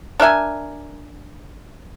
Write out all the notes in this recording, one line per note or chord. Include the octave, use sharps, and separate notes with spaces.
D4 A#4 E5 G#5